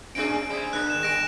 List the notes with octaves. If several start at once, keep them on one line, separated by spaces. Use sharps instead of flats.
A2 C#4 D4 G#4 D7
C3 G3 G#4
A#3 D4 F#6
D#3 E7
G3 A#6 D7 E7